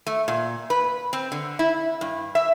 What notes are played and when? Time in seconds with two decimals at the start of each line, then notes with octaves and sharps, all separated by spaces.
0.07 A3
0.28 A#2
0.70 B4
1.13 C4
1.32 D3
1.59 E4
2.01 G2
2.35 E5